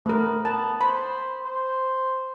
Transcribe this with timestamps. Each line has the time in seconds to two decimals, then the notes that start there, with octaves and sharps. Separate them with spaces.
0.06 A3 B3 A#4
0.45 B3 A5
0.81 C5 B5
1.45 C5